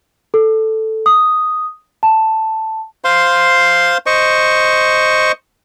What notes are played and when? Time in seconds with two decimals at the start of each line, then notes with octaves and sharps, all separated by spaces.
0.34 A4
1.06 D#6
2.03 A5
3.04 C5 F5 C6
4.06 C5 D#5 C#6